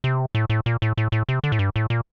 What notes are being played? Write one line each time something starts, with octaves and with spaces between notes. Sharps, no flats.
C3
A2
A2
A#2
A2
A2
A2
C3
D3
A2
G2
A2
A#2